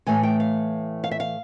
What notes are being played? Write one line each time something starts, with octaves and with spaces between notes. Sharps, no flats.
A2 E3 A3 G#5
G5
F5
F5
E5
F5